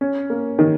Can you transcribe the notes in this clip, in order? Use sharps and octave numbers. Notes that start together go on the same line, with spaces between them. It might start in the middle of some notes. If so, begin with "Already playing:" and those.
C#4
A#3
D#3